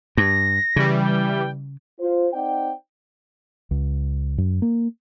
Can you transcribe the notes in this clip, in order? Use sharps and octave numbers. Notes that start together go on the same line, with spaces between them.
G2 A#6
C#3 E3 G3
G5
F4 C5
C4 D#4 D5 F#5 G5
C#2
F#2
A#3